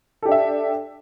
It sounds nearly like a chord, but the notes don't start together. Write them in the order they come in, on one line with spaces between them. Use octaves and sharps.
A4 G4 D4 E5